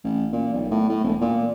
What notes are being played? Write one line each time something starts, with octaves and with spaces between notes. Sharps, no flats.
A1
A#2
B1
A2
A2
E1
A#2